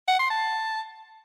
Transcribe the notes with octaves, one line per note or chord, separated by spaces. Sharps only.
F#5
C6
A5